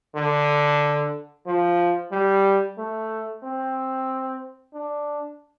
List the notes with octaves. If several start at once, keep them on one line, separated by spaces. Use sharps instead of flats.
D3
F3
G3
A3
C4
D4